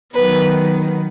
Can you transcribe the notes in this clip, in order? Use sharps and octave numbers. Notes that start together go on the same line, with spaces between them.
D#3 F#3 B3 B4